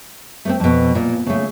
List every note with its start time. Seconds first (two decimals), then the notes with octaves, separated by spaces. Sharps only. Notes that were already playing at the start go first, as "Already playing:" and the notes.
0.45 A3 B3 C4
0.60 F2 B2
0.95 A#2
1.26 C#3 A3